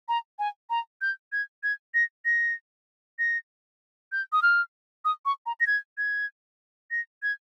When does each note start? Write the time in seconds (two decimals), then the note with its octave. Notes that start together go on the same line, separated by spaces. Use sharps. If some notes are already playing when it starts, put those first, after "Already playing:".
0.08 A#5
0.39 G#5
0.70 A#5
1.02 G6
1.32 G#6
1.63 G#6
1.94 A#6
2.25 A#6
3.19 A#6
4.12 G6
4.33 D#6
4.42 F6
5.05 D#6
5.25 C#6
5.46 A#5
5.60 A#6
5.67 G#6
5.98 G#6
6.91 A#6
7.23 G#6